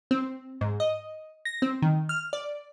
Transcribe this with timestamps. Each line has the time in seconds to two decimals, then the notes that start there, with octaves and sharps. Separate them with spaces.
0.11 C4
0.61 G#2
0.80 D#5
1.45 A#6
1.62 C4
1.82 D#3
2.09 F6
2.33 D5